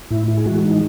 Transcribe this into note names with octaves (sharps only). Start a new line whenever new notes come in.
A2 E4
E4
G#4
E3 G#3 F#4
D#4